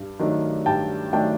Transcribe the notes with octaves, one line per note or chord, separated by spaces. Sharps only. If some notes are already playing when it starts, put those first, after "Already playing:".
Already playing: G2
D#3 F#3 A3 D4
G2 G5 A5
D#3 F#3 A3 D4 G5 A5